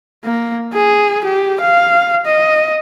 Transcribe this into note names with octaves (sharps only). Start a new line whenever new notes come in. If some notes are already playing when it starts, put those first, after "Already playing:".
A#3
G#4
G4
F5
D#5